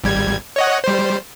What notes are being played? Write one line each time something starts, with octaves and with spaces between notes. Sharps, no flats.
G#1 G3 G#6
C#5 D#5 F#5
G3 C5